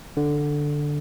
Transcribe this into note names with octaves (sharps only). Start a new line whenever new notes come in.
D3